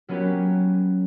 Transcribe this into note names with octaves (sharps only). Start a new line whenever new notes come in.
F#3 A#3 B3 C#4 F#4 G4